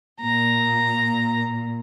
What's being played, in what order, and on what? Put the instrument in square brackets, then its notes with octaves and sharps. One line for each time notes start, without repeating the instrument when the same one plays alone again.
[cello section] A#2 [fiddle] A#5